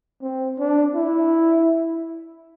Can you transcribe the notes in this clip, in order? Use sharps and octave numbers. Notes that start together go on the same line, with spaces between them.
C4
D4
E4